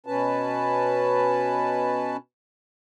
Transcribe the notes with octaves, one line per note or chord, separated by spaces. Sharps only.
B2 C#4 B4 A5